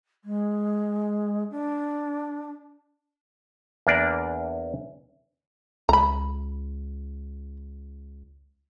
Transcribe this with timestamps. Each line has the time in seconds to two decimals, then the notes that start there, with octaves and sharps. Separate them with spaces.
0.24 G#3
1.50 D4
3.87 E2 A#3 D4 D5
5.89 C#2 A#5 B5